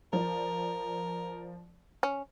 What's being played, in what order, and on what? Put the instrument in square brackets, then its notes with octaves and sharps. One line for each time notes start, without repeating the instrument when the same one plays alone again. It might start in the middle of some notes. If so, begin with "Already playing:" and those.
[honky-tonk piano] F3 D5 [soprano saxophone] A#4
[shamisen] C#4